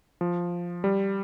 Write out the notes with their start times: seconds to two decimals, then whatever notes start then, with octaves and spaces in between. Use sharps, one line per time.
0.21 F3
0.84 G3